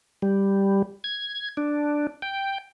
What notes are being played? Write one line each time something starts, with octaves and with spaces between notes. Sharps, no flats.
G3
G#6
D4
G5